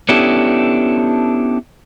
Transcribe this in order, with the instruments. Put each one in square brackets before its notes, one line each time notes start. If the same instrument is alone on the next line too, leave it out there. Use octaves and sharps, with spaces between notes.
[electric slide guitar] B3 C#4 D4 E4 G4 A4